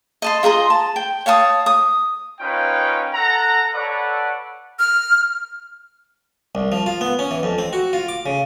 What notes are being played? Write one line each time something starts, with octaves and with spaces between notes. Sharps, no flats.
D#5 A5 C6
F4 G#4 A#5 C6
A5
G5
C#5 F5 A5 D#6
D#6
C#4 D#4 F4 A#4 B4 G5
A4 F#5 A#5
A4 B4 C#5 D5 F#5
F6
C2
F3
F4
B3
C#4
E3
F2
C4
F#4
F4
D6
C#3